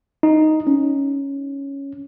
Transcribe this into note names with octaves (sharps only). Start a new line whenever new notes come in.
D#4
C#4